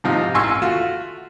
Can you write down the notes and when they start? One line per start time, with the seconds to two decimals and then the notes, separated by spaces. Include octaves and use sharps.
0.04 G#2 C3 F3 D#4
0.34 A1 G#5 C6 C#6 E6
0.62 A3 F4 F#4